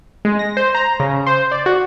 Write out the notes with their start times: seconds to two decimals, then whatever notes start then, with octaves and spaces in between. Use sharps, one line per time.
0.25 G#3
0.39 A#6
0.57 C5
0.75 A#5
1.00 C#3
1.27 C5
1.52 D5
1.66 F#4